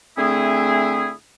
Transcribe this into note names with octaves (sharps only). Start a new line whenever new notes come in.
D3 A3 C4 E4 G#4